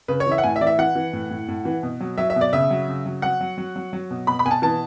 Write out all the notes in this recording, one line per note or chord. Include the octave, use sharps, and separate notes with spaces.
C#3 B4
C#5
E3
E5
F#5
A2 G#5
E5
E3 D5
E5
E3 F#5
E3
A2
A2
A2
E3
B2
F#3
F#3 E5
E5
B2
D5
C#3 E5
F#3
C#3
F#3
F#3 F#5
F#3
F#3
F#3
F#3
B2
B2 B5
B5
B2 G#5
A5
E3 A5